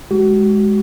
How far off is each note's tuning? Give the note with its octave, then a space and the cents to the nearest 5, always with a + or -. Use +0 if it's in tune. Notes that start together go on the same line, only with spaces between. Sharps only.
G#3 +0 F#4 +35